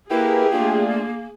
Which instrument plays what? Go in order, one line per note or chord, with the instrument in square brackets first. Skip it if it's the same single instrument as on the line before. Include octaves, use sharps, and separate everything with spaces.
[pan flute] A#3 [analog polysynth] E4 A#4 B4 [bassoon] G4 [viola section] G#4
[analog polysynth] A3 D4 F4 [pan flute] A#3